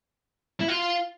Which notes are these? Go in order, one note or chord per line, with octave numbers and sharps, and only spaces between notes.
E4
F4